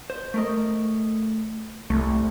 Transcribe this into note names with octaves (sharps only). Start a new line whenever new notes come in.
C5
A3 A#4 D#5
C2 A3